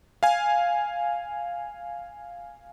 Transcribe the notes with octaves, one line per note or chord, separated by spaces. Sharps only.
F5 G#5